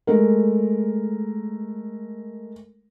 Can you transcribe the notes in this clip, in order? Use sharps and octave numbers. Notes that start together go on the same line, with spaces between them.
G#3 A3 A#4